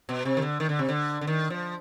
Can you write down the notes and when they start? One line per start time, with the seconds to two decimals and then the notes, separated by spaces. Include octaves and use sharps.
0.09 B2
0.25 C3
0.37 D#3
0.42 D3
0.60 D#3
0.69 D3
0.79 C3
0.89 D3
1.21 D3
1.27 D#3
1.50 F3